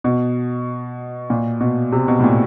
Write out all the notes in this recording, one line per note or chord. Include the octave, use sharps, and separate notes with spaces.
B2
A#2
B2
C3
B2
A2
A#2